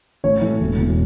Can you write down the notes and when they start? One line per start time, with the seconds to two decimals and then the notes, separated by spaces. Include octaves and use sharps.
0.24 A1 C#5
0.42 A2 E3 A3
0.60 E1
0.78 E2 B2